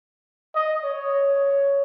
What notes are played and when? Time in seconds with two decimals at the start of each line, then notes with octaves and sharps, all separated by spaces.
0.55 D#5
0.84 C#5